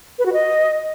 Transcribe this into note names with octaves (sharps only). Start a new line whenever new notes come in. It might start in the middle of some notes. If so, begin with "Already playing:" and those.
B4
F#4
D#5